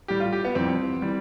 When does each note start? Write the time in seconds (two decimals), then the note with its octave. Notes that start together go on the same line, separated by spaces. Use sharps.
0.08 A2 G3 G4
0.20 F4
0.32 G4
0.45 B3
0.55 F2 E3 G3 C4
1.02 E3 G3